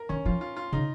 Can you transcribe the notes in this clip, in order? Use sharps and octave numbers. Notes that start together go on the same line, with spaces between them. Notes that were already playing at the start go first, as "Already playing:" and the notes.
Already playing: A#4
D#3 C#4
F3 F4
F4
F4
C#3 D#4